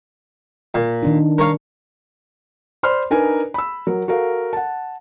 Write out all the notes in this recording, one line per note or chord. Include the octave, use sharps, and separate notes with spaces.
A#2
D#3 D4 D#4
A#4 C#5 F5
C5 D5 B5 C6 F6
D4 D#4 A#4 B4 G#5
B5 E6
F#3 A#4
F#4 A4 A#4 F5
F#5 A5